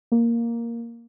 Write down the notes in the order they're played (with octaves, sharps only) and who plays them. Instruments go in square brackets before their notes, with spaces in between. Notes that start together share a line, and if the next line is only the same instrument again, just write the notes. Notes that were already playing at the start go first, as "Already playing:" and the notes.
[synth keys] A#3